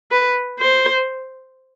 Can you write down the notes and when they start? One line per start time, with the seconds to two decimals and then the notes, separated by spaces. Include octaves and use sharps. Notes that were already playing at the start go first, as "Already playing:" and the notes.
0.11 B4
0.60 C5